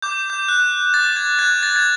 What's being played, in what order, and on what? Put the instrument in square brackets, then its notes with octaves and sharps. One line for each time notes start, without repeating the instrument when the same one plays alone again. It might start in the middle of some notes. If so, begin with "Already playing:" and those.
[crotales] D6 G6
G6
F#6
D6 A6
G#6
F#6 G#6
A6
G#6